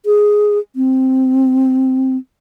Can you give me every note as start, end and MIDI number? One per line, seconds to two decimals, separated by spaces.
0.06 0.59 68
0.76 2.17 60